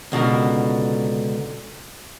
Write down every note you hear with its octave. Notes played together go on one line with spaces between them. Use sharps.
C#2 B2 D3 A#4